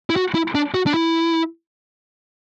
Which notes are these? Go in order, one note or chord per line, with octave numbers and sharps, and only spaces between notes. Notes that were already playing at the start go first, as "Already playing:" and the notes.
E4
F#4
E4
D4
F#4
D4
E4